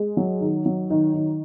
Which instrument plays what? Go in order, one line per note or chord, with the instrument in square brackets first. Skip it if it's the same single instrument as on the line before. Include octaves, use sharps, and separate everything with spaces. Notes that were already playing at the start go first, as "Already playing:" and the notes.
Already playing: [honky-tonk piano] G#3
F#3
D#3
F#3
D#3
D#3